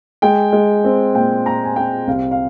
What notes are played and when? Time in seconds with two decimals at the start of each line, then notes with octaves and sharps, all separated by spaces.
0.22 G#3 G5
0.52 G#3
0.84 C4
1.15 A#2 G5
1.45 A#2 A#5
1.64 G#5
1.76 C4 G5
2.07 C2 F5
2.31 F5